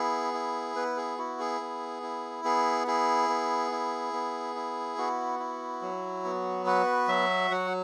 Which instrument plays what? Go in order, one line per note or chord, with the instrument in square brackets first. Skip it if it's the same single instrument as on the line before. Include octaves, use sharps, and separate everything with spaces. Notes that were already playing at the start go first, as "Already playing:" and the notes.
Already playing: [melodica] B3 E4 G#4
E4
B3 B4
G#4
E4 F#4
G#4
B3
E4
B3 G#4
E4 G#4
B3
E4
B3
E4
B3 F#4
E4
F#3
B3
F#4 B4
F#3 E5
F#3 F#5